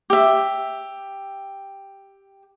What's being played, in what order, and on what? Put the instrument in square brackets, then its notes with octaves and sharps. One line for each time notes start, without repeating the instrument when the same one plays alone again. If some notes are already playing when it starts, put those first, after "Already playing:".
[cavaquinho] G4 E5